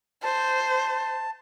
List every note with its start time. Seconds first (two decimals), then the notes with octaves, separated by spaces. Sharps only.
0.23 C5 A5